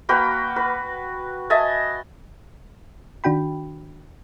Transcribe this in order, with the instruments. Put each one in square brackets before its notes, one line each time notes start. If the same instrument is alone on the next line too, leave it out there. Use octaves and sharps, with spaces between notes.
[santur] A#3 F#4 B4 G5
B4
D#5 E5 G#5 A5
[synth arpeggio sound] D#3 D4 F#4 G5 B5